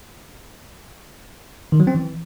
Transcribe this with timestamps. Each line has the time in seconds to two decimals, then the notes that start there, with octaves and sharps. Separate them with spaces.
1.72 D#3
1.80 F#3
1.87 C4
1.95 E3